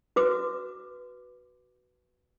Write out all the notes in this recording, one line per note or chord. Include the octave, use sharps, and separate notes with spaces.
F#4 B4 D6